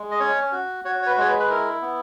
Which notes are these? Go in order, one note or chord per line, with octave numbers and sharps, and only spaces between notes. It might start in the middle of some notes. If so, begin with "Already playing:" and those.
Already playing: G#3
D#5
C#4 C#5
F#4
F#4 C#5
C#5
B4
G#3 C#5
B4
B4
E4 A#4
B3